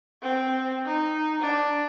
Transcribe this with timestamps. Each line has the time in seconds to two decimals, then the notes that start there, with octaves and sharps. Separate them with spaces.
0.23 C4
0.86 D#4
1.40 D4